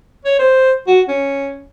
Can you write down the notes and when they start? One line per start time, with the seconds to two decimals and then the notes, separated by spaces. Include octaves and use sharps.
0.25 C#5
0.39 C5
0.87 F#4
1.08 C#4